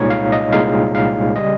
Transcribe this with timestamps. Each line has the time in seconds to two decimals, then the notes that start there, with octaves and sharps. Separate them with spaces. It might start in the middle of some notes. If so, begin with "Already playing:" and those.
Already playing: C2 A#2 G#3 D#4 C#5
0.10 F5
0.32 D#5
0.52 C2 A#2 G#3 D#4 F5
0.95 F5
1.36 C#3 G3 D#5